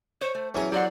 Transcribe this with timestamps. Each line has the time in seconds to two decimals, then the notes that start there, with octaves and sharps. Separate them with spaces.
0.21 C5 C#5
0.35 A3
0.54 E2 F#3 C#4 G#4 C#5 E5
0.72 F#3 G4 C5 D5 F#5